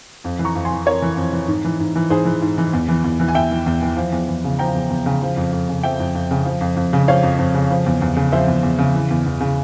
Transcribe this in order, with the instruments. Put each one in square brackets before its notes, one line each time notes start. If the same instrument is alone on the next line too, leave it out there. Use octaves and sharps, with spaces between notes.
[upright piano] F2
E3
A#5 C#6
F2
G#5 C6
E3
F2 A#4 C#5
E3
F2
E3
G#2
E3
G#2
E3
G#2 G#4 C5
E3
G#2
E3
E2
E3
E2
E3
G#5
E2 E5 G5
E3
E2
E3
F3
E2
E2
C#3
F3 G5 A#5
E2
E2
C#3
F3
F2
F2
C#3
F3 E5 G5
F2
F2
C#3
F3
F2
F2
C#3
F3 C#5 F5
F2
F2
C#3
F3
E2
E2
C#3
F3 C5 E5
E2
E2
C#3
E3
E2
E2
C#3